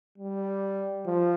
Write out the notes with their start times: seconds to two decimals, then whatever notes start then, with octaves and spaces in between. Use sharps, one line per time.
0.18 G3
1.06 F3